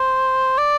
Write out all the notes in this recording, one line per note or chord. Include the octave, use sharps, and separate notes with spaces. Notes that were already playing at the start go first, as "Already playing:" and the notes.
Already playing: C5
D5